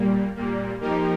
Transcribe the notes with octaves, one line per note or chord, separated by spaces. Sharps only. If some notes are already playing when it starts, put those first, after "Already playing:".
Already playing: A#2 G3 A#3
A#2 G3 A#3
F3 A#3 D#4 G4 A#4